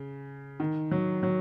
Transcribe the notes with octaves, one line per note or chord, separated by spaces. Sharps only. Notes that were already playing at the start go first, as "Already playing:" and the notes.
Already playing: C#3
D#3
F#3
F#3